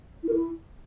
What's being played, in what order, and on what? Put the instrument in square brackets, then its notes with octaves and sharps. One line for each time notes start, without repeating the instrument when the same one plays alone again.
[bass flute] E4
A#4
E4